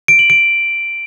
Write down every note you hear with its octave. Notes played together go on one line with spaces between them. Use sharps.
D7
F#7
D7